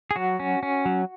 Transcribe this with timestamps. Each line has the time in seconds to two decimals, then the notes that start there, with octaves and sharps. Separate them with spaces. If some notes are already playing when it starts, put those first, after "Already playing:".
0.11 G#4
0.16 F#3 F#4
0.40 C#4
0.63 C#4
0.86 F#3